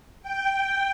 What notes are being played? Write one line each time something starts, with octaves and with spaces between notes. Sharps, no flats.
G5